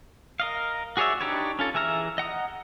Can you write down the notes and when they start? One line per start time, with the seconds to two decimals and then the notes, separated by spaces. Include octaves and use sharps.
0.40 A#4 D#5 F5
0.97 F#4 G#4 C#5 D5 E5
1.21 D4 D#4 G4 B4 C#5
1.59 C#4 F4 A4
1.74 E3 G#4 E5 A#5 F6
2.18 D#5 F#5 A#5 D#6